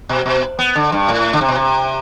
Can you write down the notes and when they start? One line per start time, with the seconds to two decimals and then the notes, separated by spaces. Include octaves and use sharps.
0.09 B2
0.26 B2
0.59 B3
0.75 D3
0.92 G2
1.08 A2
1.33 D3
1.41 C3
1.48 B2
1.56 C3